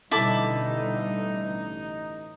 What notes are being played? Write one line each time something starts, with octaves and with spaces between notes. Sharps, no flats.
A1 B2 D3 G3 D#4 E4 A4 D6